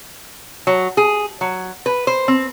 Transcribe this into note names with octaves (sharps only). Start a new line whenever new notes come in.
F#3
G#4
F#3
B4
C5
C4